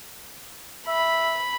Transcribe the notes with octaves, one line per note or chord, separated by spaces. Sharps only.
E5 B5